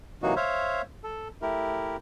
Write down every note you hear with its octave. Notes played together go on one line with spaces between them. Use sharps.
C3 E3 F#3 A#3 D#4 F#4
C5 C#5 E5 F5
A4
A3 E4 G4 A#4